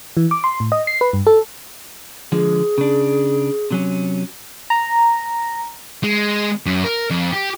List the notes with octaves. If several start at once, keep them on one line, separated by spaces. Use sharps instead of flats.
E3
D6
C6
A2
D#5
C7
B4
G2
A4
D3 F3 G#3 G#4
C#3 D4
C3 F#3 C#4
A#5
G#3
F#2
A#4
F2
G4